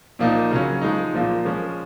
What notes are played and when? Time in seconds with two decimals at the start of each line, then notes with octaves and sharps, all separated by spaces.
0.19 A#2 F3 A#3 D#4
0.51 C#3 F#3 C#4
0.82 F3 G#3 D#4
1.13 A#2 F3 A#3 F4
1.45 F3 G#3 C#4